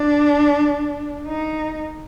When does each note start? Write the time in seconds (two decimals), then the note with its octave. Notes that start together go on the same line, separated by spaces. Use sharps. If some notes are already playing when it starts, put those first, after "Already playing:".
Already playing: D4
1.27 D#4